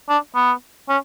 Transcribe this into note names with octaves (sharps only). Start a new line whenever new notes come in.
D4
B3
C#4